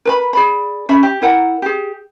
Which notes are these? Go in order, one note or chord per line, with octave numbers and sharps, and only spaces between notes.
A#4 B4 B5
G#4 D5 B5
C#4 E5 B5
G4
E4 A#4 F#5 G5
G4 G#4